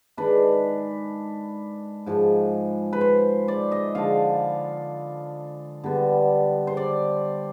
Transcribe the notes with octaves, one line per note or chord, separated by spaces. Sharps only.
D#3 G#3 D4 B4
G#2 F3 G#3
B4
C5
D5
D#5
D3 F3 G#3 D4 F5
D3 G3 B3
C5
D5